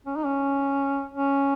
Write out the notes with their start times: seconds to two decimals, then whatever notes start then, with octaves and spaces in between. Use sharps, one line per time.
0.07 C#4
0.16 D#4
0.25 C#4
1.14 C#4